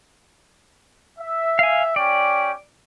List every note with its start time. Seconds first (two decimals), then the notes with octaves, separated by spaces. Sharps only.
1.19 E5
1.59 F5 G#5
1.96 C#4 G4 D5 G5